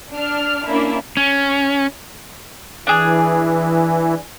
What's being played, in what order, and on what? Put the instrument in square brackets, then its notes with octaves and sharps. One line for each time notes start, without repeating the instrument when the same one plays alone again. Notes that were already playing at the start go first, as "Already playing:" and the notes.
[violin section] D4 F6
A#3 C#4 D4 E4
[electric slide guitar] C#4
[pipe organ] E3 [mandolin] D4 G#4